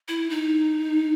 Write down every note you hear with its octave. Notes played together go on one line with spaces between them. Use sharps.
E4
D#4